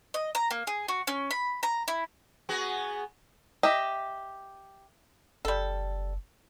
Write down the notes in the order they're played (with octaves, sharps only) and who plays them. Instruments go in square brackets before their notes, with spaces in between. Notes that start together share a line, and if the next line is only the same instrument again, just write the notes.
[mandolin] D#5
A#5
A#3
G#4
F#4
C#4
B5
A#5
E4
[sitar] B3 F#4 G#4
[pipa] G4 [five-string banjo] D#5 E5
[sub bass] F#1 [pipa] G3 A4